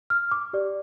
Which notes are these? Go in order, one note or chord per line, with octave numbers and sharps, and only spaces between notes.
F6
D6
G4 D5